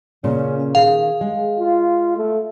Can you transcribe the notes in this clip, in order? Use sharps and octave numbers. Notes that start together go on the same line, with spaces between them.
A#2 C#3 C#4
D#3 G#4 F5
G#3
F4
A3